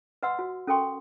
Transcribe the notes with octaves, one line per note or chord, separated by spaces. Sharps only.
B4 D#5 F#5 C6 E6
F#4
C#4 A4 A#4 G5 C6 C#6